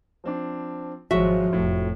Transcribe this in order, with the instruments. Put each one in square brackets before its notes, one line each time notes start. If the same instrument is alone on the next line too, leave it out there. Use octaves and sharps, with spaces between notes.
[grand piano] F3 C4 D4
[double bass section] G#1 F3 [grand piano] F#3 G#3 [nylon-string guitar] F#4 E5
[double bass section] F1 [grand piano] A2